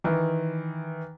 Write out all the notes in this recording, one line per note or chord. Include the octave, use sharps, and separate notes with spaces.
D#3 E3